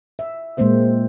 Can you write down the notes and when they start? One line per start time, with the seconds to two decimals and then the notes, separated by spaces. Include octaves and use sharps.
0.19 E5
0.57 A#2 G#3 A#3 C4 C5 E5